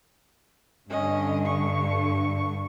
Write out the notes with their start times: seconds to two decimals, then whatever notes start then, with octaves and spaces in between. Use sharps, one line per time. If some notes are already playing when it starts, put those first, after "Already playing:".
0.90 G2 D3 C#4 D#5
1.46 C#6